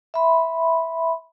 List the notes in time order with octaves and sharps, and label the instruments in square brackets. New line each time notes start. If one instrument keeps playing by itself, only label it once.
[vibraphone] E5 B5 C6